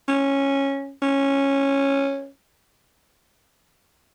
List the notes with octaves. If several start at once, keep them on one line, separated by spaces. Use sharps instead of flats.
C#4
C#4